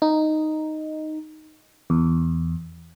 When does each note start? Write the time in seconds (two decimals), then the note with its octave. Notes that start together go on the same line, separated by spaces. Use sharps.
0.02 D#4
1.90 E2